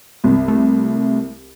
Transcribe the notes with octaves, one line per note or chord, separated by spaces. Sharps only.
C2
A3